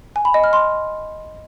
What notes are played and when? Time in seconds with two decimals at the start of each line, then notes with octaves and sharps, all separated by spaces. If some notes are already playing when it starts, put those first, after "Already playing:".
0.16 G#5
0.25 B5
0.34 D#5
0.44 F6
0.53 C6